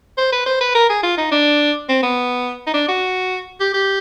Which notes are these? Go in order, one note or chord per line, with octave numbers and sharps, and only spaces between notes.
C5
B4
C5
B4
A#4
G#4
F4
D#4
D4
C4
B3
D#4
D4
F#4
G4
G4